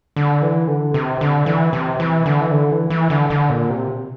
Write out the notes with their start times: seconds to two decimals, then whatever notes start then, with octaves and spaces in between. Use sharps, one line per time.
0.16 D3
0.42 E3
0.68 D3
0.94 C3
1.21 D3
1.46 E3
1.73 C3
2.00 E3
2.26 D3
2.41 E3
2.51 D3
2.71 E3
2.90 E3
3.10 D3
3.30 D3
3.50 A#2
3.70 C3